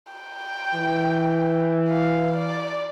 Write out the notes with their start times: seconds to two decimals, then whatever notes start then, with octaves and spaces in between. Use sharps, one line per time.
0.12 G5
0.74 E3
1.89 F5
2.36 D5